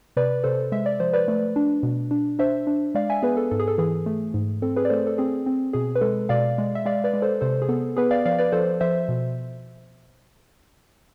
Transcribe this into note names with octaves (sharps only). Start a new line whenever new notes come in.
C3 B4 D5
C3 A4 C5
G#3 E5
D5
F3 C5
B4 D5
A3
D4
B2
D4
D4 C5 E5
D4
G#3 D5 F5
E5 G#5
B3 G#4 B4
A4
G#2 A4
G#4
A4
E3 G#4
A3
G#2
C4 A4
G#4 B4
D5
A3 A4 C5
A4
C4 G#4
C4
B2 G#4
B4
G#3 A4
B2 D5 F5
G#3
E5
G#3 D5 F5
B4 D5
G#3
A4 C5
C3 A4 C5
G#4
B3 A4
B3 G#4 B4
D5 F5
F3 D5 F5
B4 D5
F3 A4 C5
F3 C5 E5
B2